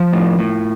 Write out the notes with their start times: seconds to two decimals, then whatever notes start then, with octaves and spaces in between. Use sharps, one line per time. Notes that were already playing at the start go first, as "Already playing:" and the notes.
Already playing: F3 F4
0.13 A2
0.39 A2